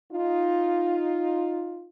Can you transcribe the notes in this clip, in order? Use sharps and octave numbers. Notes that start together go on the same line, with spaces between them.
D#4 F4